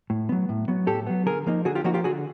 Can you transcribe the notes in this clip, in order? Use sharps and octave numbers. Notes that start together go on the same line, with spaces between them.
A2
F#3 B3
A2
F#3 B3
A2 G4 A4
F#3 B3
D3 G#4 A#4
F3 A#3 D#4
D3 F#4 G#4
F4 G4
F3 A#3 D#4 F#4
F4 G4
D3 F#4 G#4